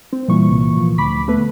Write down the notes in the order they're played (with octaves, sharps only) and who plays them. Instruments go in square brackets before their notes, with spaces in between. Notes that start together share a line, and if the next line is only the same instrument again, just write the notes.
[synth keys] C4
[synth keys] A#2 E3 C#6 [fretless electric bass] G3
[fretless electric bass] C2
F3
[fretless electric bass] D2 [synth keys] B5 D6 B6
[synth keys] A3 B3 B4